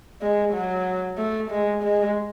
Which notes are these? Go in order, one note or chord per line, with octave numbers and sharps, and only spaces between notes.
G#3
F#3
A3
G#3
G#3